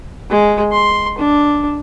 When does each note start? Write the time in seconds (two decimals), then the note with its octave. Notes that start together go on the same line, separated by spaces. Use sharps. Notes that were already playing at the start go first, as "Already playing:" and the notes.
0.30 G#3
0.72 C6
1.19 D4